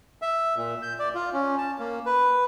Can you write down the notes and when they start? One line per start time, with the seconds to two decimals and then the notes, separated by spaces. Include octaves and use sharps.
0.22 E5
0.56 A#2
0.82 G6
0.99 D5
1.15 F4
1.33 C#4
1.58 A5
1.79 A#3
2.06 B4